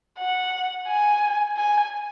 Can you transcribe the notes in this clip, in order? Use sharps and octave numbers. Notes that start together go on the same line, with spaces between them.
F#5
G#5
G#5